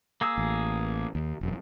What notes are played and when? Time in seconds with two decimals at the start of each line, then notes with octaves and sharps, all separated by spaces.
0.21 A#3 G#4 E6
0.38 A1
1.15 D#2
1.41 E1 F#2